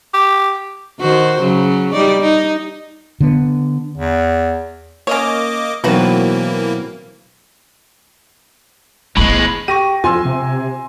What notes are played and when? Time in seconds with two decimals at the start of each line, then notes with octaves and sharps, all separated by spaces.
0.14 G4
0.99 D#3 F#4 C5
1.40 C#3 F#3
1.92 G3 D#4 D5
2.21 D#4
3.20 D3 B3
3.97 E2
5.07 A#3 C#4 C#5 D#5 D6
5.84 B2 E3 F#3 A#3 C4 D#4 F#4 B4
9.17 A2 E3 G#3 B3 B4
9.68 G4 C#6 A#6 D#7
10.04 F2 F4 G#5 C6 E6
10.25 C3